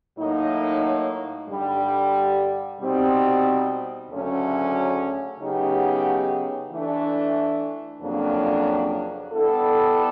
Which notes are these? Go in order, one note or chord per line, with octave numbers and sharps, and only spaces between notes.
A2 F#3 A#3 D#4
G2 D3 G3
B2 G3 C4 D#4
D2 C#3 F#3 A3 C#4
C#3 F#3 B3 D#4 G4
E3 A3 D4
F2 C#3 F#3 A#3 D4
G3 B3 E4 A4